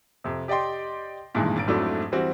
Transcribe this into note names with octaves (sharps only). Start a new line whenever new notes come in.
F2 C3
G4 D5 D#5 G5 C6
G2 A#2 D#3 E3 G#3
G#1 A6 D7
F2 G#2 F#3 A3 D4 E4
E3 G3 C4 F#4